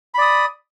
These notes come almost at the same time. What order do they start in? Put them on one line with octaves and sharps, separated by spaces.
B5 D5 D#6